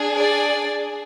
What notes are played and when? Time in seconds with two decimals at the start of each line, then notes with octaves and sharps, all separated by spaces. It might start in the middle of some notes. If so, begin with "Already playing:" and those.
Already playing: D4 G#4
0.16 D5